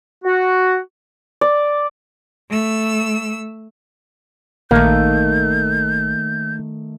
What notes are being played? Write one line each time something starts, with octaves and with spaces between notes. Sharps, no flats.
F#4
D5
A3 E6
A#1 D#3 A3 A#3 G6